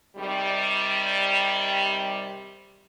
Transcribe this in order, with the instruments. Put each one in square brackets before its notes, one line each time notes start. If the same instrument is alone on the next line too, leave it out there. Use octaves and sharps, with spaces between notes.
[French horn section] C3 D#3 G3